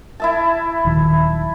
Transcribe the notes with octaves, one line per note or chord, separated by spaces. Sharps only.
E4 E5 A5
D#1 D#3 F#3